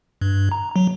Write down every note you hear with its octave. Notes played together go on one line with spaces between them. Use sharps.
G2
A#5
F#3